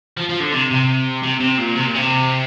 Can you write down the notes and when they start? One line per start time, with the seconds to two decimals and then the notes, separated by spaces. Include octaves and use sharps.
0.17 F3
0.29 F3
0.40 D3
0.52 C3
0.71 C3
1.23 C3
1.40 C3
1.58 A#2
1.75 C3
1.86 A#2
1.95 C3